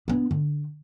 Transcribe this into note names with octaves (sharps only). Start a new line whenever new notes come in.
B3 D4
D3